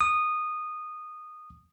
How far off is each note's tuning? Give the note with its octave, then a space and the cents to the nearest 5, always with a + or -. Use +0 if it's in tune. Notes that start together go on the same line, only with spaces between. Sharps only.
D#6 -15